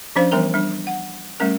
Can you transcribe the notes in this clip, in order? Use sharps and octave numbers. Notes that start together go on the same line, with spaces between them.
F3 C#4 D4 C5 F5
E3 G3 B3 A#4 A#5
G3 D4
F#5
G3 A3 C#4 A#4